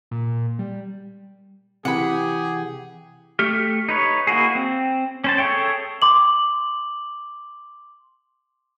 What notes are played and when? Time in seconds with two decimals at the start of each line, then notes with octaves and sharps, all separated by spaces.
0.11 A#2
0.59 G3
1.85 C3 E3 G4 G#4 F#5 B5
3.39 A3 G4 F6
3.89 D#4 B4 C#5
4.27 A#3 E4 F#4 G#4
4.55 C4
5.24 C#4 C5 A5
5.38 G#4 A4 C#5 E5 G5
6.02 C6 D6 F#7